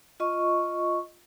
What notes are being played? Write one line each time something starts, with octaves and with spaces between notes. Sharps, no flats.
F4 D#5 C#6